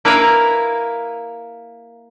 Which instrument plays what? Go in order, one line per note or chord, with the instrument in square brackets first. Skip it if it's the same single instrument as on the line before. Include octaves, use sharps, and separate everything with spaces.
[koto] A#3 E4 A#4 B4 E5 F5